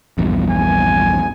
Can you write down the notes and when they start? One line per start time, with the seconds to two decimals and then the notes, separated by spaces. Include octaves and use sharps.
0.18 A#1 E2 G2
0.50 G#5